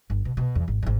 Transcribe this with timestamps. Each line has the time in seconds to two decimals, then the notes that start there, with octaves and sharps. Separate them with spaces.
0.10 G1
0.25 B2
0.37 B2
0.55 E2
0.68 G#1
0.83 G#1 G#2